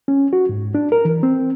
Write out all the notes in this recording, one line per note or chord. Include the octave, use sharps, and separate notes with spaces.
C#4
F#4
G#2
D4
A#4
E3
C4